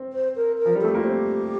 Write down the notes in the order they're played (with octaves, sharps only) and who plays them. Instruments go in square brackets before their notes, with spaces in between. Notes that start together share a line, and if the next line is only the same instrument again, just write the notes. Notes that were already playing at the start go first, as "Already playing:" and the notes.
Already playing: [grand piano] C4
[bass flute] C5
A#4
A#4
[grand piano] F3
G3
[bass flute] A4
[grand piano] A3 [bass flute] G4
[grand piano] A#3 [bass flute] F4
[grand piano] C4 [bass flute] G4